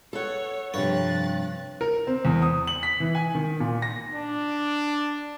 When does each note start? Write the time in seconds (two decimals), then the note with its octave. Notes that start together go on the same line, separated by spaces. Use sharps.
0.13 A4 C#5 F#5
0.74 G2 C3 F3 C#5 F#6 A6
1.81 A#4
2.07 C4
2.25 E2
2.42 D#6
2.67 F#7
2.83 B6
3.00 E3
3.15 G#5
3.35 D#3
3.60 A#2
3.82 A#6
4.14 D4